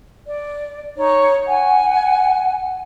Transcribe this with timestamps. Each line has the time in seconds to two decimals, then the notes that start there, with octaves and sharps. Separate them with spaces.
0.28 D5
0.96 D#4 C#5
1.47 F#5 G#5